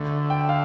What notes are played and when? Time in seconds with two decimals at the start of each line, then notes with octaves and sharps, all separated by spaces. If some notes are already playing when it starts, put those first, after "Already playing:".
Already playing: D2 D3 A3
0.30 G5
0.49 F5